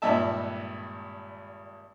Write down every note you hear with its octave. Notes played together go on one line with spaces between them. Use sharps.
G#1 G2 A#2 D#5 E5 A5